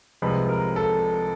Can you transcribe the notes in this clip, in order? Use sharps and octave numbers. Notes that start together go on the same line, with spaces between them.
C2 C3 F3 G#3 B4
A#4
A4